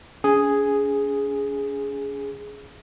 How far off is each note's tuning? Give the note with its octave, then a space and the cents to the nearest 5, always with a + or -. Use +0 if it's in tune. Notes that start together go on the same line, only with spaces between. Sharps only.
C#4 +40 G#4 +0